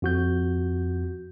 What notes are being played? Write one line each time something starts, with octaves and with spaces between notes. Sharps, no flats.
F2 F#4 G6